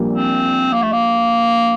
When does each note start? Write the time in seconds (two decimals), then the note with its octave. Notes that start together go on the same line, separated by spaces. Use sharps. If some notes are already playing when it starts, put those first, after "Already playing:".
Already playing: A#1 A#2 G3 A#3
0.12 C4
0.73 A#3
0.82 A3
0.92 A#3